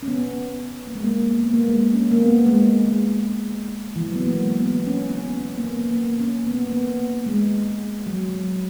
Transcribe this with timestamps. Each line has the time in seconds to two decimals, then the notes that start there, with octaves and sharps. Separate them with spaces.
0.03 C#4
0.08 B3
0.87 A#3
0.95 G#3
1.04 A#3
1.39 B3
1.53 A#3
1.67 G#3
1.93 C#4
2.11 A#3
2.20 B3
2.47 G#3
2.86 G#3
3.96 E3
4.06 F#3
4.16 B3
4.25 A#3
4.33 G#3
4.60 B3
4.87 C#4
5.09 C#4
5.26 B3
5.57 A#3
5.66 B3
5.92 A#3
6.20 C#4
6.47 B3
6.68 A#3
6.73 B3
7.26 G#3
8.06 F#3